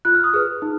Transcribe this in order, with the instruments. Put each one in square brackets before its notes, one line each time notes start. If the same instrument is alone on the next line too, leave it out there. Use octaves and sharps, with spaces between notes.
[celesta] F4 F#6
F6
D#6
G#4 B4 F6
D#4